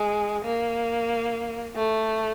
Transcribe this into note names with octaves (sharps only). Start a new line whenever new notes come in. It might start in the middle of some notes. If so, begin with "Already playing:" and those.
Already playing: G#3
A#3
A3